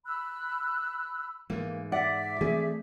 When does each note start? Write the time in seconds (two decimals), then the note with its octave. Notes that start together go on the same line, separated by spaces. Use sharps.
0.05 B5 E6 F#6
1.50 G#2 E3 A#3
1.92 D5 E5 F#5
2.41 E3 A3 C4 G#4